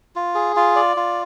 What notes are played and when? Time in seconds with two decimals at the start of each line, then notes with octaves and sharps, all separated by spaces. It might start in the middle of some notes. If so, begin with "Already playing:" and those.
0.16 F4
0.35 G#4
0.56 F4
0.76 D5
0.97 F4